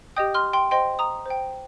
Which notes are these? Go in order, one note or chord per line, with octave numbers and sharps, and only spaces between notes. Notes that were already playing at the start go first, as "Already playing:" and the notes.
G4 D#5 G5 D#6 G6
C6 F6
G5 C6
C5 D#5 G5 C6
A#5 D#6
C5 G5